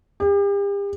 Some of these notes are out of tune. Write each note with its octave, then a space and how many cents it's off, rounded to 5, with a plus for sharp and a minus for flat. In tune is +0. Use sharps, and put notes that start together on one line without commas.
G4 +40